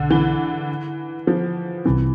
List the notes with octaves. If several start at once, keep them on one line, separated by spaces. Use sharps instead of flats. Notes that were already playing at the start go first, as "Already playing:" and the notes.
Already playing: B1 B2 D3
E3
F3
C2 C3 E3 G3 C4